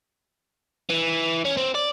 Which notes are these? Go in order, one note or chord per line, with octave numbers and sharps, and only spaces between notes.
E3
C#4
C4
D5